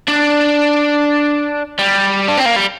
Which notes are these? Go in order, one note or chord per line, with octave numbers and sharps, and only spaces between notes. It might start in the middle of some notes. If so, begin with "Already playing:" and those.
D4
G3
D4
C4
A#3
G3